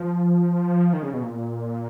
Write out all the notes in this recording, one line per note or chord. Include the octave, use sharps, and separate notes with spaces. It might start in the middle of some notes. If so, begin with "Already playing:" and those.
Already playing: F3
D#3
C#3
B2
A#2